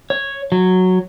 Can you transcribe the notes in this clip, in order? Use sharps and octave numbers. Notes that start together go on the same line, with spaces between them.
C#5
F#3